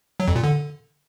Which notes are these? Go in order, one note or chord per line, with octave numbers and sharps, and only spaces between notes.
F#3
F2
A#2
D3